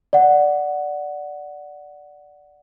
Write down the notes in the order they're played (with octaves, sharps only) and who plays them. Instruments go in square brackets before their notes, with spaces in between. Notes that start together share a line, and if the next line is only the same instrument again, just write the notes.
[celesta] D5 F#5